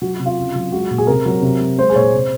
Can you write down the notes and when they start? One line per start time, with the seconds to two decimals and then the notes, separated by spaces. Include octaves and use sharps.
0.02 F#3 F#4
0.14 C3 F#4
0.26 F4
0.38 C#3
0.55 F#3
0.72 G#3 F#4
0.91 A#2
0.98 G#4
1.07 C3 A#4
1.26 F#3
1.42 C3
1.61 F#3
1.78 G#3 C5
1.90 G#4
1.95 A#2 C#5
2.02 C5
2.13 C3